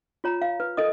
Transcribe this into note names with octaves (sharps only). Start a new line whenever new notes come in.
F4 C#5 A#5
F5
B4
A4 A#4 D#5 D#6